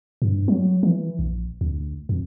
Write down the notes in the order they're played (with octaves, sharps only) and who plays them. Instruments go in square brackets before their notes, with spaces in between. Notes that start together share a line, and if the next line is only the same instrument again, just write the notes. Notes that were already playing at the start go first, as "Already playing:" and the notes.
[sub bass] G2
F#3
E3
A#1
D2
F2